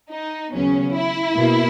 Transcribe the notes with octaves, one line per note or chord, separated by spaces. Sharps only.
D#4
D#2 C#3 F#3 B3 C#4
E4
B2 A#3